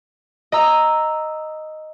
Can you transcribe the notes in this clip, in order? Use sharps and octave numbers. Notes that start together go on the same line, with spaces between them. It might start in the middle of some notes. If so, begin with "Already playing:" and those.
D#5 A#5 E6